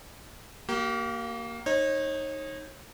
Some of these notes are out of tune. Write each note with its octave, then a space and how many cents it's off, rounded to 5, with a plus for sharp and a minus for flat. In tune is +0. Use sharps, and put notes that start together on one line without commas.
A#3 +0 G4 -40
D#4 +0 C#5 -35